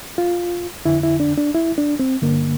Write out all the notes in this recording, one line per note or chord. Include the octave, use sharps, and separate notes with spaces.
F4
F2 D3 E4
E4
D4
D4
E4
D4
C4
G2 D3 A#3